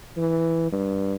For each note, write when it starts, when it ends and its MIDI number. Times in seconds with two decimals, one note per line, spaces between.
0.17 0.69 52
0.72 1.16 43